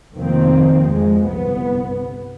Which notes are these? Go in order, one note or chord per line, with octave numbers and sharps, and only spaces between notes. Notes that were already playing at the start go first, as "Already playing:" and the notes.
F1 D#3 F3 A#3 C4
F2 F3 G#3
G1 C2 B3